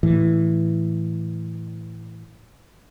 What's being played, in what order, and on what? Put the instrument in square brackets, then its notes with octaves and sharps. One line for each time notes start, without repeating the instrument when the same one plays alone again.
[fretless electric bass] A2 E3